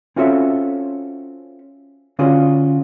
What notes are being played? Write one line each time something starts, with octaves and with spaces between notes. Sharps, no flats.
C4 C#4 F4 F#4 A4 E5
D3 C#4 F4 F#4 G#4